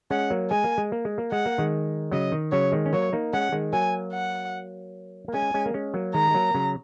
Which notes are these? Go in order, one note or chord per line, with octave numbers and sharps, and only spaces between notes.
G#3 C#4 F#5
F#3 A#3
G#3 G#5
A#3
G#3
A#3
G#3
A#3
G#3 F#5
A#3
D#3 G#3
C#3 F#3 D#5
D#3
C#3 F#3 C#5
D#3 G#3
C#4
F#3 A#3 C#5
A#3 D#4
G#3 C#4 F#5
D#3 G#3
F#3 A#3 G#5
F#5
A#3
G#3 C#4 G#5
G#3 C#4
A#3
G#3 C#4
F#3 A#3
D#3 G#3 A#5
G#3
F#3 A#3
C#3 F#3